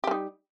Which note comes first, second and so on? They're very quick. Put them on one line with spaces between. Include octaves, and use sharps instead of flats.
G4 G3 D#4